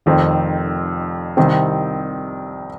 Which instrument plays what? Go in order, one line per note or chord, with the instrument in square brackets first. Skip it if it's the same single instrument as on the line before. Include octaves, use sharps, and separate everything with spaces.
[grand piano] F1 F2 D#3 C4
C2 C3 D#3 C4